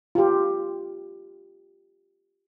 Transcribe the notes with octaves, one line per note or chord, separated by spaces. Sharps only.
F4 G4